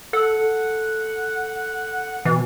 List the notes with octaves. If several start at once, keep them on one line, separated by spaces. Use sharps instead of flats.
A4 F#5
B2 E3